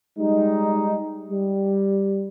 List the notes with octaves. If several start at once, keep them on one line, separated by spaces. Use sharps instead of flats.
G3 G#3 D#4
G3